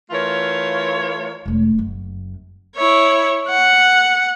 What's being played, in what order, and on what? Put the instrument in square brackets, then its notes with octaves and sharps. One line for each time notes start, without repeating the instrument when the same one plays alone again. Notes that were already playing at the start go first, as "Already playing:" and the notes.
[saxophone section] E3 A3 F4 A#4 C#5
[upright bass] E1 A3
F#1 F#2
[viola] E4 C#5
F#5